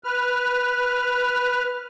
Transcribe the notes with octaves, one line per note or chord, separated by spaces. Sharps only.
B4 F6